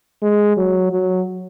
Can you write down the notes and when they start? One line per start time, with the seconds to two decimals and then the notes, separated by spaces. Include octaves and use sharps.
0.22 G#3
0.57 F#3
0.91 F#3